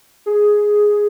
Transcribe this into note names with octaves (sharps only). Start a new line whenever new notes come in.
G#4